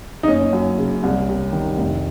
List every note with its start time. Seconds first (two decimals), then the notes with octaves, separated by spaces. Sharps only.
0.23 D#4
0.28 F#1 C#4
0.53 F#2
0.78 C#3
1.03 C2
1.28 C3
1.53 D#3
1.78 F1